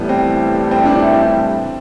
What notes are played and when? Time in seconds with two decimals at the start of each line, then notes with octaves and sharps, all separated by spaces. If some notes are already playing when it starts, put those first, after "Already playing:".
Already playing: A2 E3 G3 B3
0.09 C4
0.71 C4
0.86 D4
0.99 E4
1.13 D4